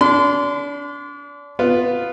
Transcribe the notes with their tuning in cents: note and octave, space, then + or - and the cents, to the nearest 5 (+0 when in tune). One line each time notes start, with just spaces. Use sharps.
D4 -35 C6 -30
B3 +0 F4 +0